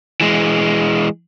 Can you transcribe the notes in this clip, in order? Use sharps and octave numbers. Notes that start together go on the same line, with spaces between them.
E3 G#3